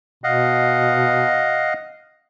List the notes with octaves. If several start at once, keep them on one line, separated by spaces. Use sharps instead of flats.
B2 D#5 F5 F#5